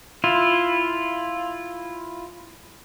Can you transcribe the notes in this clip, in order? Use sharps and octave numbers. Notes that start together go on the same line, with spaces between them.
E4 F4